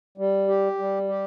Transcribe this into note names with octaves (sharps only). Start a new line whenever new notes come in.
G3
G4
G3
G4